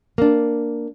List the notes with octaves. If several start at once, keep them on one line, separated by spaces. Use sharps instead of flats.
A#3 D4